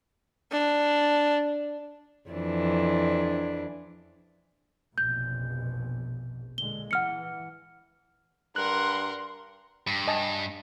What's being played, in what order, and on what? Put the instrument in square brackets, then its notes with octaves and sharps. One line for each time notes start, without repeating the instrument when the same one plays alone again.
[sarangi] D4
[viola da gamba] F2 E3 D4
[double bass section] F1 A#1 B2 [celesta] G6
[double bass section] A#2 D3 G#3 [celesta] G7
[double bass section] E3 [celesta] F#5 F6 C#7
[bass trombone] G2 [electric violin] A#4 F#5 [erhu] C6 [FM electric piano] F#6
[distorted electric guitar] G2
[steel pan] D#5 G#5 A5